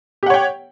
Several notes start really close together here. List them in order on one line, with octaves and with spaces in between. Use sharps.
G4 F#5 C#5 G5